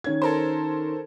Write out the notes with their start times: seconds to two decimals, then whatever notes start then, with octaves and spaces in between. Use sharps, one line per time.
0.04 D#3 C#4 G#6
0.22 A4 A#4 C5